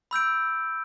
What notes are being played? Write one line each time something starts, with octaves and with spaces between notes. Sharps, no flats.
B5 E6 G6 D7